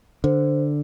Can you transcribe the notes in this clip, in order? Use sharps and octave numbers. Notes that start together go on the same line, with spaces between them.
D3 C5